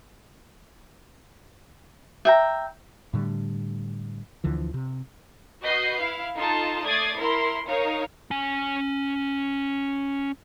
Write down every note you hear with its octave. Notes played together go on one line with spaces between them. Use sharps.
E5 G5 A#5
A2 D3 G3
D2 D3 E3 F3
C3
F#4 B4 D#5 G6 C7
E4 F5
D#4 F4 A4 A5 C6
A3 D5 D#6 G#6 A6 C7
E4 A#4 C6
D#4 A#4 C#5 F5
C#4 G#5